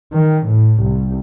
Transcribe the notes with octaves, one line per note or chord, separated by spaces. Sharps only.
D#3
A2
C2